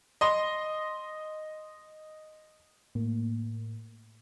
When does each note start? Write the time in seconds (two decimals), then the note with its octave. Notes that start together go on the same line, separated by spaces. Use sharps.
0.21 D#5 C6
2.95 A2 A#3